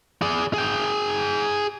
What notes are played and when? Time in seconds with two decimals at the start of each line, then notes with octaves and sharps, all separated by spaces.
0.22 G#4 D5
0.54 G#4 G5